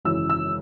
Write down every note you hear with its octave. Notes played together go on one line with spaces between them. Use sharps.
G#1 F#2 C#3 E3 E6
E6